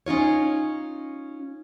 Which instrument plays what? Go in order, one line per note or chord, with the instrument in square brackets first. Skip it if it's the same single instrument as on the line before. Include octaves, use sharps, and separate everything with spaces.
[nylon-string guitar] C#4 D#4 F4 C#5